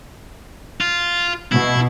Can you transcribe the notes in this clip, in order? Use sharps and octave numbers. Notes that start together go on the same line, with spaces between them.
F4
B2 E4